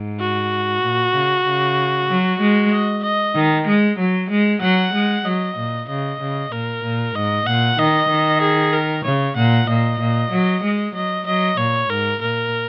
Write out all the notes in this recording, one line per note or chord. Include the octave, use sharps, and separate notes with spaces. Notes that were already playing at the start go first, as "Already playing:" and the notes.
Already playing: G#2
F#4
A#2
C#3
C#3
F#3
G#3
D#5
D#5
D#3
G#3
F#3
G#3
F#3 F#5
G#3
F#3 D#5
A#2
C#3 D#5
C#3
A#2 A#4
A#2
G#2 D#5
A#2 F#5
D#3 D#5
D#3
G#4
A#4
C#3 C#5
A#2 F#5
A#2 D#5
A#2
F#3
G#3
F#3 D#5
F#3 D#5
A#2 C#5
G#2 A#4
A#2 A#4